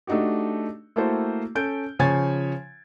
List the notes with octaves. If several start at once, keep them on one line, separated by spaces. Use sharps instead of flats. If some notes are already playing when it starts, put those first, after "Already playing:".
A3 D4 D#4 F#4 G4
A3 A#3 E4 F#4 A4 C5
C#4 A4 G6 D7
C#3 F3 C#5 G#5 G#6 A6